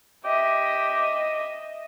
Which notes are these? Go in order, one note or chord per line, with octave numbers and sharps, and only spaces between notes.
G4 D#5 E5